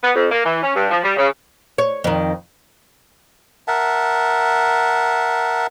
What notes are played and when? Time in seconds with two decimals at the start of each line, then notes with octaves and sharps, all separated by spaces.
0.04 B3
0.15 F2
0.31 A#3
0.44 E3
0.63 C#4
0.75 G2
0.91 F3
1.03 G3
1.17 C#3
1.78 C#5
2.04 F2 D#3
3.68 A#4 E5 F#5 A5